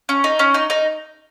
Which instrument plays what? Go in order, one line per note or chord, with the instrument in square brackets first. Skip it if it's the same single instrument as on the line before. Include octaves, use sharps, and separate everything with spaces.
[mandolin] C#4
D#4
C#4
D#4
D#4